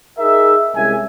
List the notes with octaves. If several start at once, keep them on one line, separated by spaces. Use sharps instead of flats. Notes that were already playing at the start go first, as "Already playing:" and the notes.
D#4 G#4 A#4 D#5 E5
C2 G#3 C#4 E5 G#5